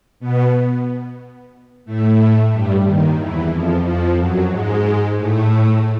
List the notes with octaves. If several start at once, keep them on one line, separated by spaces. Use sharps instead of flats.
B2 B3
A2 A3
G2 G3
D#2 D#3
E2 E3
F2 F3
F2 F3
F#2 F#3
G#2 G#3
A2 A3